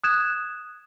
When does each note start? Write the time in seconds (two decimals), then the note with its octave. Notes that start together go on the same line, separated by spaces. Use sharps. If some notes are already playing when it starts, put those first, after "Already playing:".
0.04 D#6 F#6 G#6 E7